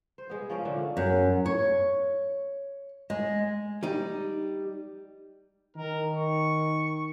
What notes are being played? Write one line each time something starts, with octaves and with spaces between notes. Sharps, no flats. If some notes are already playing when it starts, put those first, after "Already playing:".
C5
G#3 B3
F3 C#4 A#4
A#2 D3 F3 A3
F#2
C#5
G#3
G3 D#4
D#3 A#4
C#6